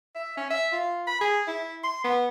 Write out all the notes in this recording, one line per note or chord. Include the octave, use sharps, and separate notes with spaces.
E5
C#4
E5
F4
B5
G#4
E4
C6
B3